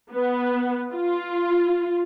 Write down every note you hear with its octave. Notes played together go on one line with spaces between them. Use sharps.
B3
F4